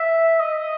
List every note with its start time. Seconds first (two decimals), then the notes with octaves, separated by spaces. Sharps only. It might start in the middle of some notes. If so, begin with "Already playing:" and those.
Already playing: E5
0.40 D#5